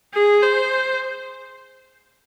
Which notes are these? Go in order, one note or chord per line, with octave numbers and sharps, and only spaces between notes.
G#4
C5